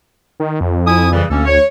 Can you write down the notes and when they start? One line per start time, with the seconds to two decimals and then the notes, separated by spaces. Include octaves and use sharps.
0.40 D#3
0.61 F2
0.86 E4 G#5 D#6
1.12 C#3 E3 G3
1.30 D2 A#3 C#4 A4
1.46 C#5